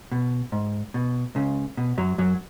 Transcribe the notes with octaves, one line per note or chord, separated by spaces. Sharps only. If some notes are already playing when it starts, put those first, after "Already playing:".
B2
G#2
B2
C#2 C#3
B2
F#2 F#3
F#2 F#3